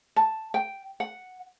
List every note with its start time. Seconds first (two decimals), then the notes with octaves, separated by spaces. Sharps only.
0.16 A5
0.54 G5
1.00 F#5